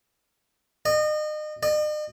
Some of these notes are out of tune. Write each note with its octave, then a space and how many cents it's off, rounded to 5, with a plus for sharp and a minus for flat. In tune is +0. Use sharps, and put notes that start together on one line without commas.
D#5 -35
D#5 -45